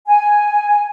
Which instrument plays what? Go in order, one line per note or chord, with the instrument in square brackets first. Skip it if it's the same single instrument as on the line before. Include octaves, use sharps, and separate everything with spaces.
[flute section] G#5